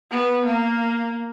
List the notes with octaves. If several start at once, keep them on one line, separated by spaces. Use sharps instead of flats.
B3
A#3